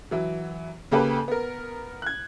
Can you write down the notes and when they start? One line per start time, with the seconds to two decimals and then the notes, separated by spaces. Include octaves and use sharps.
0.11 E3 F#3
0.91 C#3 A#3 G4 A4 B4
1.28 B3 A#4
2.02 F#6 G#6